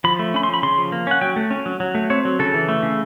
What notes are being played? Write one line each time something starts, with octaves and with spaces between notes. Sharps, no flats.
F3 B5
A3
C#4 B5
C6
F3
B5
C#3 C6
F3
A#3
C#4 F#5
F#3 G5
A3
C#4
F#3
F#3
A3
C4 C#5
F#3
C#3 A4
E3
A3
C#3